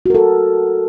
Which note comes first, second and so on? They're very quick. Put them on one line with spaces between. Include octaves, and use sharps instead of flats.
F#4 A#4 A4